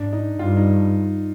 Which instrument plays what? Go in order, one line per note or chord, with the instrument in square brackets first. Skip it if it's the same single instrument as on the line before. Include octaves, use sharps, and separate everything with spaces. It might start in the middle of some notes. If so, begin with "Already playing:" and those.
Already playing: [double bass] G#2 [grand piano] D4
[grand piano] D#4
[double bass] G2 [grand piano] F4
[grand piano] D#4